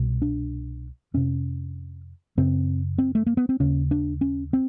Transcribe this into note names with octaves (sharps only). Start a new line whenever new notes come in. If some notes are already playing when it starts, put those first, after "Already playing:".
Already playing: C2 B2
D4
F2 C3 C#4
F#2 C#3 C4
C4
A3
A#3
B3
C4
D#2 C#3 C#4
D4
C#4
C4